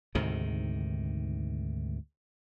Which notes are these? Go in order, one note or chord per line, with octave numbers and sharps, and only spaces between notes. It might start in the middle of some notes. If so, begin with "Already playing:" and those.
D2 G#2 C3 D#3